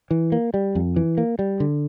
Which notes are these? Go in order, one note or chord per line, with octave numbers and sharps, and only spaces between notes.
E3
A#3
G3
F2
E3
A#3
G3
D3